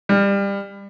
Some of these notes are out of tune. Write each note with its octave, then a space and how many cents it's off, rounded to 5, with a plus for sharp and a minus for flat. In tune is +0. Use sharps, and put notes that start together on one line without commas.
G3 +25